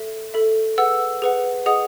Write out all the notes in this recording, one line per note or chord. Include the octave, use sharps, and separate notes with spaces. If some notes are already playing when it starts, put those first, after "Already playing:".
Already playing: A4 E5
A4 E5
G#4 B4 F#5 E6
G#4 B4 F#5
G#4 D#5 F#5 D#6